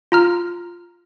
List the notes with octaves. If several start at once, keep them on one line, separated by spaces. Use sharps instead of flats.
F4 A#5 F6